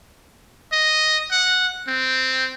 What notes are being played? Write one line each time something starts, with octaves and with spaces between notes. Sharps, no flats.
D#5
F#5
C4